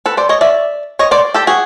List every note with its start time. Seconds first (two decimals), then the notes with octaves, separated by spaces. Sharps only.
0.06 A4 B4
0.17 C5 D5
0.29 C#5 D#5
0.41 D5 E5
0.99 C#5 D#5
1.11 C5 D5
1.34 G4 A4
1.47 F#4 G#4